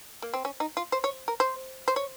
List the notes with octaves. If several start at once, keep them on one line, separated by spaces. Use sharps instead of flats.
A#3
C4
C#4
D#4
F4
C5
C#5
A#4
C5
C5
C#5